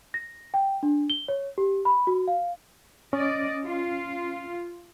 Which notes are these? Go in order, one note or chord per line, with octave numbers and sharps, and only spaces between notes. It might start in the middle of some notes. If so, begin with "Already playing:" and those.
A#6
G5
D4
G7
C#5
G4
B5
F#4
F5
C#4 D5 D#5
F4